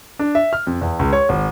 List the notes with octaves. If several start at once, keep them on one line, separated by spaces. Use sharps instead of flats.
D4
E5
F6
F2
E2
C#2
C#5
G#1